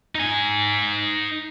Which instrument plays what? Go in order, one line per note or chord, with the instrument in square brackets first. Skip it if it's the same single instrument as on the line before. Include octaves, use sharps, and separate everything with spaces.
[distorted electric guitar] D#4 G#5